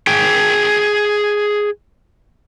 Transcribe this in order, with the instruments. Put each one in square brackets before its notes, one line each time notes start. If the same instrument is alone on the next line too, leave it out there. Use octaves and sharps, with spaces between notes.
[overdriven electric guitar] G#4 G5